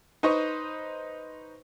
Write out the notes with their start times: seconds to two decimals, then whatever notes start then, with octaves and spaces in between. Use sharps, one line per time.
0.23 D#4 B4 C5 D#5 C#6